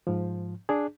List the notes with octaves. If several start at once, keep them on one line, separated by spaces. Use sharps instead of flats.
G#2 F3
D4 G#4